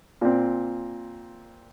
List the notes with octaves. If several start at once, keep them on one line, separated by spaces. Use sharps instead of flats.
A#2 C4